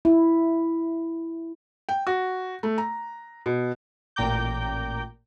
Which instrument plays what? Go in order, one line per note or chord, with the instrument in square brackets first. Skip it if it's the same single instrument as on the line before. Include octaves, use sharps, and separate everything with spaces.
[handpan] E4
[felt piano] G5
F#4
A3
A#5
B2
[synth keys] A1 A#2 G5 A#5 D6 G6